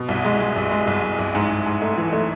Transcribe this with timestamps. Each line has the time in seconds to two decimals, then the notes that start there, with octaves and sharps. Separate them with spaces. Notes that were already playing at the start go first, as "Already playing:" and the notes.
Already playing: B2
0.09 C2
0.25 G#3
0.40 G#3
0.56 C2
0.71 G#3
0.87 C2
1.03 C2
1.19 C2
1.35 G#2
1.50 G#2
1.66 G#2
1.82 A3
1.97 E3
2.13 A3